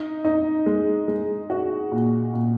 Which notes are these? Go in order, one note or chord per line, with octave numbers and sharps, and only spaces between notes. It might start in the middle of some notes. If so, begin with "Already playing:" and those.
Already playing: D#4
D#4
G#3
G#3
F#4
A#2
A#2